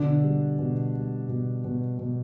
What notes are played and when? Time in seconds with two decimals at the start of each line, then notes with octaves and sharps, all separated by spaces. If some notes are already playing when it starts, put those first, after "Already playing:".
Already playing: B2 D3 D4
0.24 G3
0.59 B2
0.94 G3
1.28 B2
1.64 B2
1.99 B2